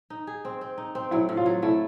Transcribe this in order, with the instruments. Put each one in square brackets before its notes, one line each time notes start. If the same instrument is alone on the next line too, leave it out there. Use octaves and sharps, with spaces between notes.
[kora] D#4
G#4
C4
C4
D#4
C4
[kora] F#3 [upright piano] E4
[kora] A2
[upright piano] F4
[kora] F#3
[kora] A3 [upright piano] E4